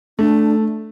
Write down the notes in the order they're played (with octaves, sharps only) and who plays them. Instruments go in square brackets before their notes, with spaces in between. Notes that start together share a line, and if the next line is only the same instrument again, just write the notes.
[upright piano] A3 [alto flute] D4